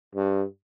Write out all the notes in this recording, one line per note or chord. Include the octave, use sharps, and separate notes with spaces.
G2